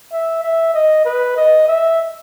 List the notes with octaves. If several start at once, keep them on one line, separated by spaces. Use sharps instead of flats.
E5
E5
D#5
B4
D#5
E5